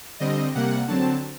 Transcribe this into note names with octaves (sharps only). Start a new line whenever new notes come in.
D3 G3 C4 D#5
C3 G3 A#3 F#5
D3 F#3 C4 A5